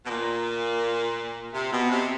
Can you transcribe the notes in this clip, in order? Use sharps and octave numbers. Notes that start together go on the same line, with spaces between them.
B2
A#2
C3
B2
C3